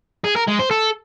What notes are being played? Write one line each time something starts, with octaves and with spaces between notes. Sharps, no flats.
G#4
A#4
G#3
C5
A4